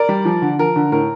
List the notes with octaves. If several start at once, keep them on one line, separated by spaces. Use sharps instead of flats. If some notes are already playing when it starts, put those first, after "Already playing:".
Already playing: A#4 D5
G3
F3
D3
F3 A#4
D3
A2 A#4